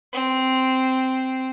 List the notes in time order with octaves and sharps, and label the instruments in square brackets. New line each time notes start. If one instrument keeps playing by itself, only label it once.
[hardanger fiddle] C4